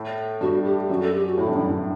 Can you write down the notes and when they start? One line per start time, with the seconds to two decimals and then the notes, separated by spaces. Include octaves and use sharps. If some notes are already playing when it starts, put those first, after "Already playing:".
Already playing: A2
0.41 G2 F#4
0.65 G4
0.89 F#2 F#4
1.03 A4
1.14 G4
1.26 F#4
1.38 A2 E4
1.47 G2
1.55 F#2
1.65 G2